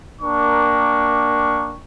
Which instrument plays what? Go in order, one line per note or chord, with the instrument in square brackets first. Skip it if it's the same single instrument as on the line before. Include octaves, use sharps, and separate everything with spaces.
[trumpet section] A#3 D4 A#4 G5 C#6